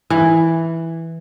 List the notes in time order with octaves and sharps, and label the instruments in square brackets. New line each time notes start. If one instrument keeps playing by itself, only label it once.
[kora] E3